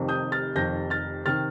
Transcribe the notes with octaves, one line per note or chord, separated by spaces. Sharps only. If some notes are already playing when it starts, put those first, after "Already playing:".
Already playing: F1 F2 C3 D#3
D#6 G6
F6 A6
F1 F2 C3 D#3 G6 A#6
F6 A6
C3 D#3 F6 A6